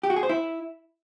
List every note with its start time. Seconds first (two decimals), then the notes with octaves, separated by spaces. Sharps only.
0.03 G4
0.10 F#4
0.16 G#4
0.23 C5
0.29 E4